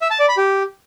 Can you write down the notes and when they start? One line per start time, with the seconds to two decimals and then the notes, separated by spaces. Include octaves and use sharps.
0.02 E5
0.11 A5
0.19 D5
0.28 B5
0.37 G4